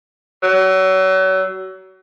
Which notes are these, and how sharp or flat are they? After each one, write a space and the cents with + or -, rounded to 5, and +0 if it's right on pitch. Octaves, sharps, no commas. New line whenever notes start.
F#3 +35